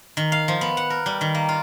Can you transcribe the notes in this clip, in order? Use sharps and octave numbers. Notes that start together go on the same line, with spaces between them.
D#3
F5
F3
B3
F#5
A#4
G3
D#3
A#3
F4